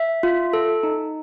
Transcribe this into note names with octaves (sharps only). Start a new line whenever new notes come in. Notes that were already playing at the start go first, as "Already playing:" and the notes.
Already playing: E5
F4
A4
D#4